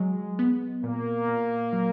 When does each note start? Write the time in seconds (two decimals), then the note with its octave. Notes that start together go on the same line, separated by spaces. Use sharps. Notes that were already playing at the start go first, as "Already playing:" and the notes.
Already playing: F#3 G#3
0.39 B3
0.83 A#2 A#3
1.28 A#2
1.73 F#3